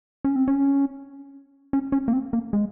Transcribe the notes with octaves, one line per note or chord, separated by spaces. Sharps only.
C#4
C4
C#4
C#4
C#4
A#3
C4
A#3
G#3